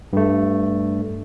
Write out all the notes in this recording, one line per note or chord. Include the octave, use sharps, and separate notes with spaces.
G2 A3